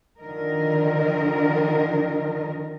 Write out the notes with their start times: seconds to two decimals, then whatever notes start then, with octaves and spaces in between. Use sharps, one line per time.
0.19 D3 D#3 F3 A#4 D#5